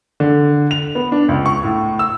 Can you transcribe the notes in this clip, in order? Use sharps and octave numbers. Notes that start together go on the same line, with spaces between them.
D3
F7
B3
D4
C#2
C#6
A2
E6